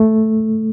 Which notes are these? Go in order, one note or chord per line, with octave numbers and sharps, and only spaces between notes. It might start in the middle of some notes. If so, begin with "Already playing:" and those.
Already playing: A3